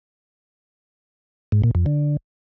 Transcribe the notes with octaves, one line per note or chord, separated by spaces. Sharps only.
G#2
A#2
F2
D3